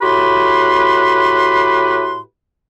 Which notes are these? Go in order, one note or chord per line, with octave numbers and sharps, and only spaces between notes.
A2 F#4 G4 B4 B5 C6